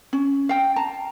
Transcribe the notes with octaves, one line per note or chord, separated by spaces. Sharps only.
C#4
F5 G5
A5 A#5